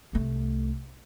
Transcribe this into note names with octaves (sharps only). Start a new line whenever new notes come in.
C2 A3